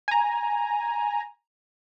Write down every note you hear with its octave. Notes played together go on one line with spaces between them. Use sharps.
G#5 A#5